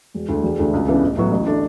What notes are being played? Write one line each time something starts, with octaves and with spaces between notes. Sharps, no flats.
E1
D2 D3
E1
D2 D3 A3 D4
C#2
C#3 E3 B3 D4
A1
A2 F#3 B3 F#4
A1
D3 A3 D4